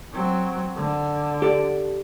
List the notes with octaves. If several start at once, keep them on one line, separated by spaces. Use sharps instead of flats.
F#3 C4
D3
G4 A4 D5